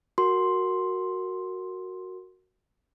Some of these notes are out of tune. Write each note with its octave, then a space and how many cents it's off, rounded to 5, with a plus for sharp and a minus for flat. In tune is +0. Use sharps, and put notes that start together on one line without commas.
F#4 +0 A#4 -10 C6 +0